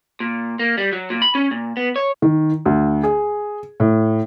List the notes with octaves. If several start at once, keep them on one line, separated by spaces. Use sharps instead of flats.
A#2
A#3
G3
F#3
A#2
B5
C#4
A#2
B3
C#5
D#3
D2
G#4
A2